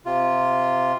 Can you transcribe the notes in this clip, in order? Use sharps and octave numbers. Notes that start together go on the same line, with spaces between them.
C3 F4